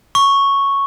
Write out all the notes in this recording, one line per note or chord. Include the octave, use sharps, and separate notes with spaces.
C#6